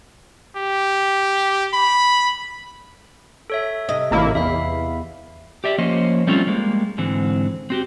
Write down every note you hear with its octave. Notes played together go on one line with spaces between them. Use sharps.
G4
B5
A4 C#5 E5
C3 D#5
A1 A#3 E4
E2 E5 F5 B5
G4 D5 E5
F3 A#3 C#4 C5 D#5
G3 A3 C4 C#4 F4
G3 G#3 A#3
G#2 D3 E3 C4
C4 F#4 G4